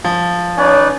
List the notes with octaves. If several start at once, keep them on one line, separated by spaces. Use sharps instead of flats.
F3
C#4 D#4 B4 D5